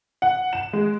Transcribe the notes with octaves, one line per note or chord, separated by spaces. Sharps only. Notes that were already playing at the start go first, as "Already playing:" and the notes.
F#5
E7
G#3